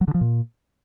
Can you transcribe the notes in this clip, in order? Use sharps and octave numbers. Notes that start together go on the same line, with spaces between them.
F#3
D3
F3
A#2